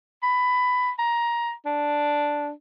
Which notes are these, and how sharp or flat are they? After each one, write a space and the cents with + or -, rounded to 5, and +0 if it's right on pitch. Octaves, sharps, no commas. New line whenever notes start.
B5 +15
A#5 +15
D4 +0